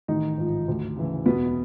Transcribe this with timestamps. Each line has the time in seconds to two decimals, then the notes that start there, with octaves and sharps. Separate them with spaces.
0.08 A1 D#3 D#4
0.38 G#2 F3
0.68 D2
0.97 C#3 E3
1.26 E1 B2 B3